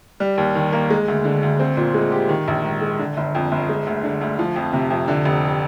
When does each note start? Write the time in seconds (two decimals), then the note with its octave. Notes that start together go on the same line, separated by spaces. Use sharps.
0.20 G3
0.38 D#2
0.55 D#3
0.72 A#3
0.90 G#3
1.08 D2
1.25 D3
1.43 D2
1.60 C4
1.77 A#2
1.94 G#3
2.12 G4
2.29 D#3
2.48 A#1
2.64 G#2
2.81 G#3
2.99 D3
3.17 G1
3.35 F2
3.52 G1
3.69 G#3
3.86 D2
4.04 D3
4.21 D2
4.39 F3
4.56 F2
4.73 C3
4.90 F2
5.08 D3
5.25 F1